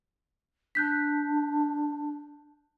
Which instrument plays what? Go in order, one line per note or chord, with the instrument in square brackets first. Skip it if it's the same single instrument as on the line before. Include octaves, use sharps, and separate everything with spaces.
[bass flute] D4 [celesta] F#6 G6 B6